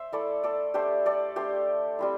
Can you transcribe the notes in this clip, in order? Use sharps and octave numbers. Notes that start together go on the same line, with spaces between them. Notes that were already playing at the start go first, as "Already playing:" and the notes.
Already playing: C5 E5
A3 E4 A4 D5
A4 D5
A3 D4 G4 C5
A4 D5
A3 D4 G4 C5
G3 C4 E4